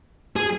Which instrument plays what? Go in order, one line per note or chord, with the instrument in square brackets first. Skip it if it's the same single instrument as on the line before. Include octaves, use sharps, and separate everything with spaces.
[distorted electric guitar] G#4